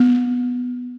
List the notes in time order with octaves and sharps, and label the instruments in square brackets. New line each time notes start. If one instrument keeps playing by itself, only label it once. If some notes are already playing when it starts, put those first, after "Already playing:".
Already playing: [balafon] B3